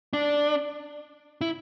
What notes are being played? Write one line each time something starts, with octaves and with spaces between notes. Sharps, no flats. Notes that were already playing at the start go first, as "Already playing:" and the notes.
D4
E4